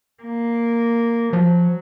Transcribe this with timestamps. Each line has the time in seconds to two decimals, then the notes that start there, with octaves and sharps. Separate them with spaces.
0.23 A#3
1.33 F3 F#3